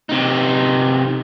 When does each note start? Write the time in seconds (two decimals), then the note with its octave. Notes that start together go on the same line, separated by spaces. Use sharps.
0.09 C3 D#4